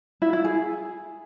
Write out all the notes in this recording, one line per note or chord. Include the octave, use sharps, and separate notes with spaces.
E4
E4
G#4